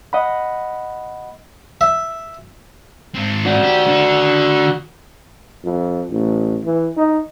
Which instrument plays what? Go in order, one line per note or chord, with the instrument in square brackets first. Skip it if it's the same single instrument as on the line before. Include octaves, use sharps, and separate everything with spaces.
[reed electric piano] D#5 F#5 B5
[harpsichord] E5
[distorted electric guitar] G#2 C4
[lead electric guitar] F#4 D5
[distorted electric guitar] G4
D3 D4
[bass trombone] F2
A1
E3
D#4